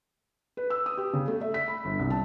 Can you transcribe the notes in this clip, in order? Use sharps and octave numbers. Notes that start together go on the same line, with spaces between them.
B4
E6
D#6
G4
C#3
A3
E5
B6
B5
G1
C2
A5